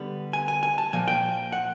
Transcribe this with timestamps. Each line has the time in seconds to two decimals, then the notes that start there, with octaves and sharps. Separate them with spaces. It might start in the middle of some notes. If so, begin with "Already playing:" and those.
Already playing: D3 G3 B3
0.33 G#5
0.48 G#5
0.63 G#5
0.78 A5
0.93 A#2 F3 A#3 G#5
1.08 G5
1.52 F#5